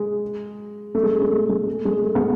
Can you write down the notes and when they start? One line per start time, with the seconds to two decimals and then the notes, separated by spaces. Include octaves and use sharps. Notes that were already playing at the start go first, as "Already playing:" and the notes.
Already playing: G#3
0.95 A3
1.03 G#3
1.13 A3
1.22 G#3
1.30 A3
1.49 G#3
1.67 A3
1.85 G#3
2.04 A3
2.15 G#3 B3